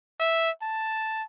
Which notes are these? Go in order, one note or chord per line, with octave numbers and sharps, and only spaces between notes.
E5
A5